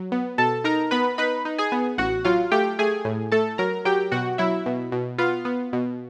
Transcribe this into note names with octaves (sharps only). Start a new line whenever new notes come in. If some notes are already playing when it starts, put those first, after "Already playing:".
Already playing: F#3
B3
B2 A4 A5
D#4 A#4 A#5
B3 B4 B5
D#4 B4 B5
D#4
G#4 G#5
B3
A1 F#4 F#5
F#3 F4 F5
A3 G4 G5
A3 G#4 G#5
A2
A3 A4 A5
F#3 A#4 A#5
F#3 G4 G5
B2 F#4 F#5
F#3 E4 E5
B2
B2
B3 F4 F5
B3
B2